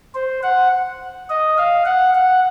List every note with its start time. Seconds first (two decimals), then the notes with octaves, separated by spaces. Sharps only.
0.14 C5
0.43 F#5
1.29 D#5
1.57 F5
1.85 F#5
2.15 F#5